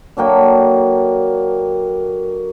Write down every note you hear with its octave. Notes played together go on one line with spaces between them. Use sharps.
D3 F#3 A#3 G5